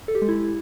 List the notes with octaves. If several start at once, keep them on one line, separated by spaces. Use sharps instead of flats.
A4
G4
G#3
E4